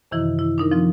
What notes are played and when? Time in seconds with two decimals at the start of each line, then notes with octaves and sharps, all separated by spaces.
0.11 F#2 C3 D#3 E3 E4
0.39 E4
0.58 D4 D#4 A#4
0.72 F3 C4 F4